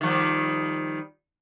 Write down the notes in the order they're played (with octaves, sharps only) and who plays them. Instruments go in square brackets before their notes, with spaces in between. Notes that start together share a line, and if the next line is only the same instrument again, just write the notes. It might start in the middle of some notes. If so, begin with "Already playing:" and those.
[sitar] D#3 F3 G3